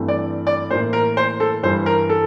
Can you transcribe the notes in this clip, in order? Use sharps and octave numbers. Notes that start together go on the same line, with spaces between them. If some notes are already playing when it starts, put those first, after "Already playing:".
Already playing: G2 E3 A3 C4
D5
D5
A2 E3 A#3 C5
A#4
C5
A4
G2 E3 G3 C5
A#4
A4